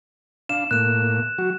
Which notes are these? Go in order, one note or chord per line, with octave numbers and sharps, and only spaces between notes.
D4 F5 E7
A2 A#3 F#6 E7
F#3 F#4